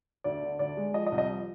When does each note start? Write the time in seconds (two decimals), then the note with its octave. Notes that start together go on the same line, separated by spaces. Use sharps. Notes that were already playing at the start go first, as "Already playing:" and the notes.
0.24 D2 D5
0.43 D3
0.59 D2 D5
0.77 G#3
0.94 F3 D#5
1.06 D#5
1.12 C2
1.18 D#5
1.30 F3